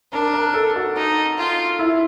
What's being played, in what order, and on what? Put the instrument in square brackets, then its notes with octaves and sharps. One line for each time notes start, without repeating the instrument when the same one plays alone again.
[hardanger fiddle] D4 [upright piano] A#4
[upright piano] A#4
A4
F#4
[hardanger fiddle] D#4
F4
[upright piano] E4